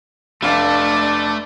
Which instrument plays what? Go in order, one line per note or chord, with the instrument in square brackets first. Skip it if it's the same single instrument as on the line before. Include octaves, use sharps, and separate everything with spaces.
[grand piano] F1 F5 [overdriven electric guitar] A3 [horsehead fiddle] D4 D5